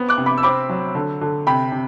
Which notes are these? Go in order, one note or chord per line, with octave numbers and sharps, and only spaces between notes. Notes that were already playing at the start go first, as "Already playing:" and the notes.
Already playing: B3 C4
D6 F#6
C3
B5 D6
E6
C4 B5 D6
F#3
D3
D3
C3 G5 B5
C3